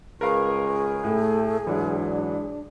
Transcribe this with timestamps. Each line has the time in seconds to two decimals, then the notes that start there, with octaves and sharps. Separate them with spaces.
0.21 C#2 G#4 A#4 B4 F5 C#6
1.04 A2 A3
1.67 G#2 E3 F#3 D4